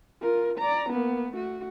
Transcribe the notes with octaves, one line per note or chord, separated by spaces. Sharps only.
F4 A#4
D5 A#5
A#3 B3
A3 F#4